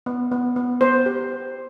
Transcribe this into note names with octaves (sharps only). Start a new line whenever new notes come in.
B3
B3
B3
B3 C5
G4